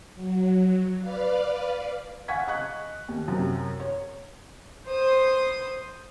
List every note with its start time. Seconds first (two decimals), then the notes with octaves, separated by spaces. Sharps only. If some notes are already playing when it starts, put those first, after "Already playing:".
0.14 F#3
0.99 B4 D5 F5
2.28 F5 F#5 G#5 C#6 G#6 B6
2.48 D#5 C#6 F#6
3.09 D#2
3.28 F#2 C3
3.80 C#5
4.87 C5 D#6